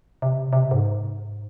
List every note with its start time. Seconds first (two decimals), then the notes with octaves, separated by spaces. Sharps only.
0.22 C3
0.53 C3
0.71 G#2